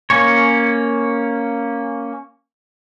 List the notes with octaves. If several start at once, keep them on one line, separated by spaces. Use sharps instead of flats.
A#3 C#4 C#5